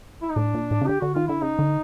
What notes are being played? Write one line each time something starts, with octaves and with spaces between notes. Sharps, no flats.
E4
D#4
A2 D4
A#2
A2
C#3
D3 G4
D3 F#4
D#3 F4
D3 E4
C#3 D#4
D3